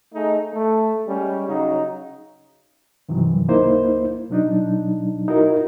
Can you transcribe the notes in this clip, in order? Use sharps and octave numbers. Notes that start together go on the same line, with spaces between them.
A3 D#4 G#4
A3
G3 G#3 C#4
C#3 F#3 D#4
G2 C3 D#3 E3 F#3
C#2 A#3 D#4 E4 C5
B2 F#3 D4 D#4
D#4 E4 F#4 A#4